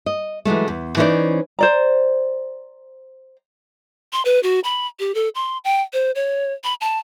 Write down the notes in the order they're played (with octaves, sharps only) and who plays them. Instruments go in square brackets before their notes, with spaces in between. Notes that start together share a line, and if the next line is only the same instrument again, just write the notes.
[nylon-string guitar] D#5
E3 F#3 G#3 A3
E2
E3 C#4 D#4 E4 C5 D5
[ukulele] C5 D5 A#5
[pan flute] C6
B4
F#4
B5
G4
A4
C6
G5
C5
C#5
B5
A5